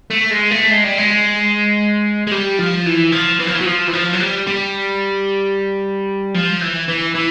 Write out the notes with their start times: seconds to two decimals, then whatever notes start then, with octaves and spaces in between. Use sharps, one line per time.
0.10 A3
0.31 G#3
0.51 A3
0.71 G#3
0.84 G3
0.98 G#3
2.27 G#3
2.32 G3
2.59 F3
2.86 E3
3.12 F3
3.40 E3
3.47 F3
3.55 E3
3.61 F#3
3.66 F3
3.88 E3
3.93 F3
4.13 F#3
4.20 G3
4.47 G3
6.34 F3
6.61 E3
6.88 E3
7.15 E3